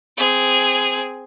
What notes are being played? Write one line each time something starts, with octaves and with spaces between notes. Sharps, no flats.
C4 G#4